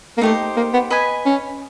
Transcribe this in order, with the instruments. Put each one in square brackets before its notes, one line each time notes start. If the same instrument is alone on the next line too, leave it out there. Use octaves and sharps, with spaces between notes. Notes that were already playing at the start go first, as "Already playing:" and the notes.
[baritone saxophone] A#3
[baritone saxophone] A3 [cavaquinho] D#4 G4 C5
[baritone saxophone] A#3
B3
[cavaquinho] B4 D#5 G#5 B5
[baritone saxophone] C#4